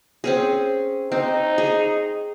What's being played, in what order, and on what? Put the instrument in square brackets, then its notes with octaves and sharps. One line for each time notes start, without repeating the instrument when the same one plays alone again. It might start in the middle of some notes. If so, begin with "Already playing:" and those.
[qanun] C4 C#4 G#4
[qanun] C4 [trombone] D#4
[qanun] G#4